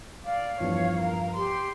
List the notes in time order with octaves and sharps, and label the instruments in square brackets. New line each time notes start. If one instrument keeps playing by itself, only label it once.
[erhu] D5 [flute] F5
[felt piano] E2 G2 F3 [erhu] C#5
[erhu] A#4
[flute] G4 [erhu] C6